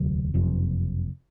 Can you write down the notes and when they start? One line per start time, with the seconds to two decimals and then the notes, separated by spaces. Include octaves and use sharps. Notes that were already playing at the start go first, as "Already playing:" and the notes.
Already playing: E1 D2 C3 F#3
0.34 F#1 F2 C3